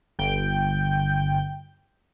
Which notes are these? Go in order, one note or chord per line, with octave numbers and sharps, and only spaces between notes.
G1 G5 G6